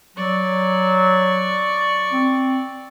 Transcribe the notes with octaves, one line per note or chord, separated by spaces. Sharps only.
F#3 D5 C#6
C4